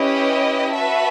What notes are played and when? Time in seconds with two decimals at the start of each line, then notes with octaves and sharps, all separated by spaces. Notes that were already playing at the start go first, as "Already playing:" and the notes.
Already playing: C#4 E4 G4 B4 D#5
0.74 F#4 B4 E5 A5